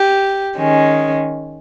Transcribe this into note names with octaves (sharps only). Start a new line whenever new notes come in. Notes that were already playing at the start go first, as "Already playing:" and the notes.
Already playing: G4
D#3 G#3 C#4